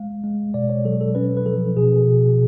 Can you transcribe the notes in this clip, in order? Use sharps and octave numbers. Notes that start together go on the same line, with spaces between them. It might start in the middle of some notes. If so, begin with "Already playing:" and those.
Already playing: G#3 F5
G#3
B2 D5
C#5
F#3 A4
A4
C#4 B4
B4
F3 A4
B2 G#4
B2